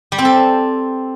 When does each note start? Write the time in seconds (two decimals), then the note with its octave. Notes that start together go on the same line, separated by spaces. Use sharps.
0.12 G3
0.18 C4
0.25 A4